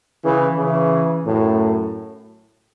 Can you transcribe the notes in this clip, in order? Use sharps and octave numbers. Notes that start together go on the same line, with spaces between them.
C#3 E3
C#3 E3
F#2 A2